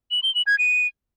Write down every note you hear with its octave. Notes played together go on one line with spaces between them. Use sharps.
F#7
G7
F#7
G#6
D#7